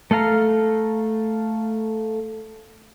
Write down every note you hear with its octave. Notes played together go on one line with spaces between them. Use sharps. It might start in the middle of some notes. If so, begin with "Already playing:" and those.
A3 A4 F5 A#5